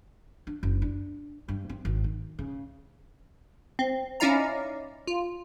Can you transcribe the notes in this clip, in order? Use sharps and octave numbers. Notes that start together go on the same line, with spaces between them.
D4
F#1
D4
G2
C4
G#1
D#3
C#3
C4
C#4 D#4 E4 D5 F5 A#5
F4